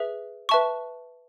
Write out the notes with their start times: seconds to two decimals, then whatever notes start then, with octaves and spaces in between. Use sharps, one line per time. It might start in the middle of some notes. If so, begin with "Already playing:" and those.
Already playing: G#4 B4 E5
0.49 B4 E5 A5 C#6